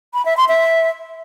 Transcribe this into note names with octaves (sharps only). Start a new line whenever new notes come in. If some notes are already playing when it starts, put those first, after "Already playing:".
B5
E5
C6
E5